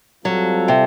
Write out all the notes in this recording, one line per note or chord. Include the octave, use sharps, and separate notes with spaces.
F#3 G3 C4 F4 A4
C3